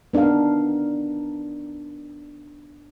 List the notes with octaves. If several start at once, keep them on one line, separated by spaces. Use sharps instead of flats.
B3 D4 D#4 A#4 F5